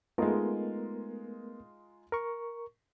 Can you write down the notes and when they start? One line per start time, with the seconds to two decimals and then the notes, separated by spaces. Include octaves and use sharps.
0.18 G#3 A3 B3 D#4 F4 A#4
2.12 A#4 C#6